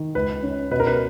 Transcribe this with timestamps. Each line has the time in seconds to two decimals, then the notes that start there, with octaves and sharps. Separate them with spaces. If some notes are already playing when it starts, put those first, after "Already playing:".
Already playing: D#3
0.15 C#2 B4
0.43 C#4
0.71 B2 B4
0.80 A#4
0.87 B4